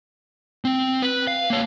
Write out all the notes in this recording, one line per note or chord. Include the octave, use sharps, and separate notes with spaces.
C4
B4
F5
A#3 C#5